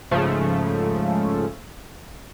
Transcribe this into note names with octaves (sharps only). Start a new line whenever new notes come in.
G#2 C#3 F3 A3